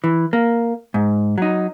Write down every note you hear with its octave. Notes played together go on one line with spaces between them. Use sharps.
E3
A#3
G#2
F#3 D#4